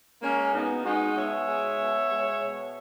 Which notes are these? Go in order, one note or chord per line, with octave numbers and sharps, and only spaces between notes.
G#3 A#3 C#4
B2 B3 D#4
G#3 D#4 F#4
B2 C#5 E5
G#3
B2
G#3
B2